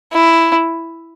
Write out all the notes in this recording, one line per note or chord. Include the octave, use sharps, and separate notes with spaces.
E4